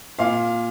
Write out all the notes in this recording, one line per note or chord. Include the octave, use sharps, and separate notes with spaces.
A#2 F5